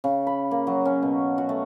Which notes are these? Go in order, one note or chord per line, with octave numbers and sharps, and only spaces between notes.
C#3
B5
A#3
F#3
C#4
B2
F#4
A3